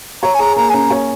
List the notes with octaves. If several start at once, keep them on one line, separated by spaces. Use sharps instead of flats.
C#5 A#5
G#5
G#4 A#5
A#3 A#5
G#5
C#4 A#5
C#5